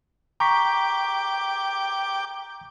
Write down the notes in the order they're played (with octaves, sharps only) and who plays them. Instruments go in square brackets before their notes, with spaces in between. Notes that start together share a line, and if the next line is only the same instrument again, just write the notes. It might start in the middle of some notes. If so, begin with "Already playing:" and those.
[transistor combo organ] G5 D6 [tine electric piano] A#5 C#6 B6